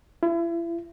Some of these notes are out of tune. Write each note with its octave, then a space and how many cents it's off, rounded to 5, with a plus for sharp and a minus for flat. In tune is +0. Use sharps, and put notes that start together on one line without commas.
E4 +35